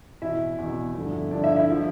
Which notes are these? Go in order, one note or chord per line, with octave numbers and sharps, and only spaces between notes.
E2 B2 E4 E5
E2 B2
G2 D3 F3
G2 D3 F3 D4 D5
E4 E5
E4 E5
F3